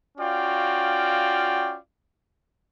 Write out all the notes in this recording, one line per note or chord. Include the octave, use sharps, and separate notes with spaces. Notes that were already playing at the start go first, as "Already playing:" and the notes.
C#4 F4 F#4 D5 F5 G5